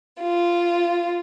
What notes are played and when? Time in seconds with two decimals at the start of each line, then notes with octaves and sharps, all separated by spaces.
0.22 F4